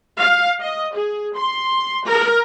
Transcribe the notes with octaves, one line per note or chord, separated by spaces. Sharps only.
F5
D#5
G#4
C6
A#4